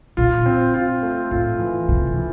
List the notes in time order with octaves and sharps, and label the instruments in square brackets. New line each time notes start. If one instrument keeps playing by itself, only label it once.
[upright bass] A#2 [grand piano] F4
[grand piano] C4
F4
A3
[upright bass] A2 [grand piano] F4
[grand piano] E3
[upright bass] C3 [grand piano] E3
[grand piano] E3